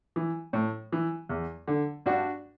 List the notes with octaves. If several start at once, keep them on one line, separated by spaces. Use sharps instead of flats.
E3
A2
E3
E2
D3
G2 D4 F#4